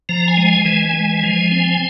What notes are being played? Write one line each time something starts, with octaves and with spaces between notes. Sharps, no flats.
F3 A#5
G#5
G#3
G#5
E3 G#5
G#3
F3
C4